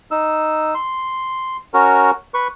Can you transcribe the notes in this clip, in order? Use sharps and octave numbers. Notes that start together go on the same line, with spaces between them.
D#4 E6
C6
C#4 F#4 A#4
B4 C#6